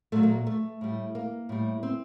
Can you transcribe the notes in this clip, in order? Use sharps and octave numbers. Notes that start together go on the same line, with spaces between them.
A#2 F#3 A3
A#3
A3
A2 G3
A#3
A2 G3
C4